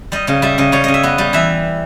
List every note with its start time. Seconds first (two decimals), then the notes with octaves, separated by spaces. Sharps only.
0.12 G3 D#5
0.27 C#3 D#5
0.42 G3 E5
0.58 C#3 D#5
0.72 G3 C#5
0.84 C#3 D#5
0.94 E5
1.03 B3 D#5
1.18 G3
1.33 E3 E5